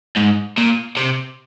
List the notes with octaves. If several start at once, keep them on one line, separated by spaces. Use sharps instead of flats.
G#2
A#2
C3